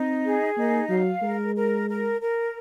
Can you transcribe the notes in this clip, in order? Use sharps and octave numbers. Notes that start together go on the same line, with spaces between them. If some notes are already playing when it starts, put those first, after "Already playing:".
Already playing: C4 D#4
G#4
A#3 D#4
F#3 F5
G#3 A#4
A#4
A#4
A#4